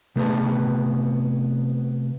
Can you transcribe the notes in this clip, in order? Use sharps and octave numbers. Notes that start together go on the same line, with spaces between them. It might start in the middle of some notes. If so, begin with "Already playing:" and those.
C3 A3 B3 G#4 B4 A5